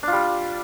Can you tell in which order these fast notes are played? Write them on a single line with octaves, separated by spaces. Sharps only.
D4 F4 G3